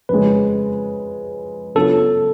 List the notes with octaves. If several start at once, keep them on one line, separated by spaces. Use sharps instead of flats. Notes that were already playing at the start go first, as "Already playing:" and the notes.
F2 C#3 G#3 B4
C#3 F#3 B3 D4 F4 A4